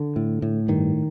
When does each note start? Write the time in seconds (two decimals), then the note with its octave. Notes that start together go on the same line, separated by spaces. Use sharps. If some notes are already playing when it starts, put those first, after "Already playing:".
Already playing: D3
0.16 A2
0.42 A2
0.68 G2 D#3